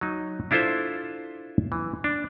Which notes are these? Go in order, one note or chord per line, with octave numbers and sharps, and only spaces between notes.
F#3 D#4
D4 E4 F4 A4 C5 E5
E3
D4